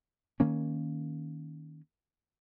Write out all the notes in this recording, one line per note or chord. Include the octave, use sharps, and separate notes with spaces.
D#3 A#3 C#4